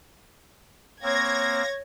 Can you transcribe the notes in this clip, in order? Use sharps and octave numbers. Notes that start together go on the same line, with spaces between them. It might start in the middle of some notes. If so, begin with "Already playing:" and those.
A#3 C4 C#5 G#6 A#6